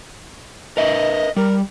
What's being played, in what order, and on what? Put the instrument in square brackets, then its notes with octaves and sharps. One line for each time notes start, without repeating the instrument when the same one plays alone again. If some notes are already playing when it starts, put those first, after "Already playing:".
[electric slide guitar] A#4 B4 E5 [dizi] D#5
[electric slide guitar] G3 [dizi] A#4